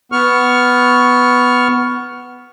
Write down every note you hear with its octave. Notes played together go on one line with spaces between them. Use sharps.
B3 C#6 F6